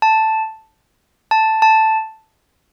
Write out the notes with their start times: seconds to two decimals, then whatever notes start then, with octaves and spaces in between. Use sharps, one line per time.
0.02 A5
1.31 A5
1.62 A5